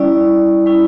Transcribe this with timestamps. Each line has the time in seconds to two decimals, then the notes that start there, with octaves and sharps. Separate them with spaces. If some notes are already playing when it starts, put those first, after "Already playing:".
Already playing: G3 C#4 E4 D5
0.66 G3 C#4 E4